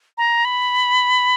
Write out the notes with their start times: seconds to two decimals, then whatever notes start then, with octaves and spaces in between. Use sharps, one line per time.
0.18 A#5
0.45 B5